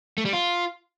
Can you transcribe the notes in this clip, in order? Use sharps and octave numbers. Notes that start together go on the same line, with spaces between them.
A3
G3
F4